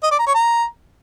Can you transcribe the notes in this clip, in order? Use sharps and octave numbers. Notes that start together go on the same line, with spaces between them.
D#5
D5
A#5
C#5
A#5